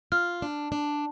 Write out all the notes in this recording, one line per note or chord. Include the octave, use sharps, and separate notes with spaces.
F4 F6
D4
D4